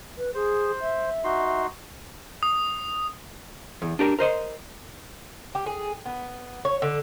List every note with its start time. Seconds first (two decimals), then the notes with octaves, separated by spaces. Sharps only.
0.18 B4
0.34 G#4 C5
0.81 E5
1.24 D#4 F#4 C6
2.43 D#6
3.82 E2
3.99 D4 G4 A#4
4.19 A#4 C5 D#5 C6
5.55 G4
5.66 G#4
6.06 B3
6.65 C#5
6.82 D3